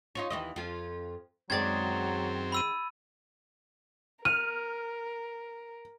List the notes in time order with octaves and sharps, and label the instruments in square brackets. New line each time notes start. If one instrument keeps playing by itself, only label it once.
[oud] D#4 F4 C#5
D#2 E3 D#5
F2 F4
[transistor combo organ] F#2 C4 [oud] D#3 G#3 D5 [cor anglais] F#3 [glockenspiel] G#6 A6
[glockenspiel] B5 E6 D#7
[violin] A#4 [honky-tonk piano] F6 [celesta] D#7